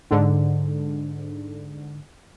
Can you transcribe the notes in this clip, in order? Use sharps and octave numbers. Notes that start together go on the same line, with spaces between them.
G#2 D3